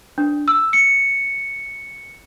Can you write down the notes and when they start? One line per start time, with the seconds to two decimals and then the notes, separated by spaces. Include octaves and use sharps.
0.18 D4
0.48 E6
0.73 C#7